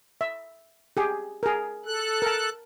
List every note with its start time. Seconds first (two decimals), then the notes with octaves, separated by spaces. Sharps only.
0.21 E5
0.97 G4 G#4
1.43 G#4 A#4
1.86 A4 F#6
2.22 A#4 A5